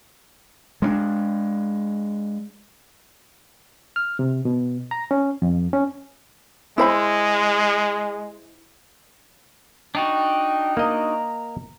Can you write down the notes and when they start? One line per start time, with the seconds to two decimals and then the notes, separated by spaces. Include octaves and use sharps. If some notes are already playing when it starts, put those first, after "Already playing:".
0.82 G#3 C4 D4
3.96 F6
4.19 C3
4.45 B2
4.91 A#5
5.11 C#4
5.42 F2
5.73 C#4
6.78 G#3 E4 C5 B5
9.95 D4 D#4 F#4 G5
10.77 A#3 D#5 A#5